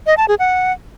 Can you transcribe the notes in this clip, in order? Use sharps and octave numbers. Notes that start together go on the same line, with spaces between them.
D#5
A5
G#4
F#5